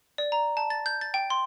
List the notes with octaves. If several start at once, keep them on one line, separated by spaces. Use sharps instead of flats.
D5
A#5
A5
A6
G6
A6
G5
C6